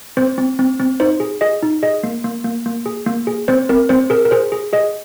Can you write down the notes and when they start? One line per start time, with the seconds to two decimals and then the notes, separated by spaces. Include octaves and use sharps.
0.17 C4 C5
0.38 C4
0.59 C4
0.80 C4
1.00 D#4 C5
1.20 G#4
1.41 G#4 D#5
1.63 D#4
1.83 G#4 D#5
2.03 A#3
2.24 A#3
2.44 A#3
2.66 A#3
2.86 G#4
3.06 A#3
3.27 G#4
3.48 C4 C5
3.69 C4 A#4
3.89 C4 C5
4.10 G#4 A#4
4.25 A#4
4.31 G#4 C5
4.52 G#4
4.73 G#4 D#5